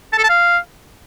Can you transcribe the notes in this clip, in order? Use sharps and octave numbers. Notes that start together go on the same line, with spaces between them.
A5
A4
A5
F5